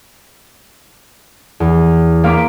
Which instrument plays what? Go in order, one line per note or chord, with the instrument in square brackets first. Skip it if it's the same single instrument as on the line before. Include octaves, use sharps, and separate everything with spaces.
[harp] E2
A#3 F5 C6 D6 B6